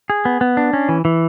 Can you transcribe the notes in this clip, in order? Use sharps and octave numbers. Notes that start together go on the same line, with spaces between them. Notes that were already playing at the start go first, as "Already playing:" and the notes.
G#4
B3
B3
D4
C#4
E3
E3